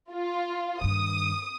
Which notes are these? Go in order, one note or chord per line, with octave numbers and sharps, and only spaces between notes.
F4
G2 D#3 D#6